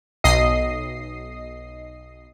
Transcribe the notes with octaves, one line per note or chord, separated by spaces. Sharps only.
B1 D#5 D#6 C7